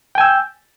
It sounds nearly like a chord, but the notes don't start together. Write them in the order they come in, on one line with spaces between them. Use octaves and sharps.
G5 G#5 E6 G6